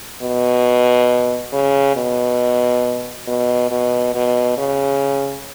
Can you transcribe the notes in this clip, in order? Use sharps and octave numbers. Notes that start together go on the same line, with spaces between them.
B2
C#3
B2
B2
B2
B2
C#3